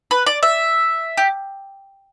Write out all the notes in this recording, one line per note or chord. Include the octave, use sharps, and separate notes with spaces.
B4
D5
E5
G4